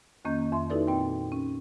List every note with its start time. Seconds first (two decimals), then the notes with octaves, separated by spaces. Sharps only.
0.25 F2 D#3 A#3 C#4 D#5 G6
0.52 F2 E5 C6
0.70 D#4 E4 F#4 A4 B4 D5
0.87 A#2 C4 G5
1.32 C#4